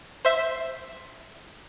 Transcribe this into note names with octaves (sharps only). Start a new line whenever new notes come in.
C5 E5